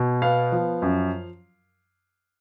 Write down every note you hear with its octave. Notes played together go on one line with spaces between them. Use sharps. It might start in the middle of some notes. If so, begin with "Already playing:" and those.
Already playing: B2
B3 F5
F3
F#2